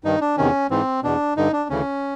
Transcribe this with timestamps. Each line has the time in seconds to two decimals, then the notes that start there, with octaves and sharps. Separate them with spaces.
0.04 G2 D#3 D#4
0.21 D4
0.37 E2 C3 D#3 C#4
0.70 G#2 E3 C4
1.03 E2 B2 D4
1.37 G2 D3 D#4
1.53 D4
1.70 D2 C#3 E3 C#4